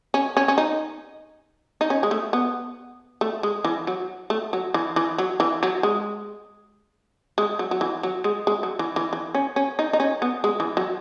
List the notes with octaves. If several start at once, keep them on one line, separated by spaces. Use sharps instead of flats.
C#4
C#4
C#4
D#4
D#4
C#4
G#3
A3
B3
A3
G#3
E3
F#3
A3
F#3
E3
E3
F#3
E3
F#3
G#3
G#3
F#3
F#3
E3
F#3
G#3
G#3
F#3
E3
E3
E3
C#4
C#4
D#4
D#4
C#4
B3
G#3
E3
F#3